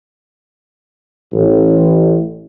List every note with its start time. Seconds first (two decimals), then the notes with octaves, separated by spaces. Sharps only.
1.33 A1